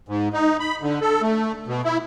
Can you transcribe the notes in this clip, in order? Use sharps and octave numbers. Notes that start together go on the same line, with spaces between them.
G#2
D#4
B5
D3
A4
A3
B2
E4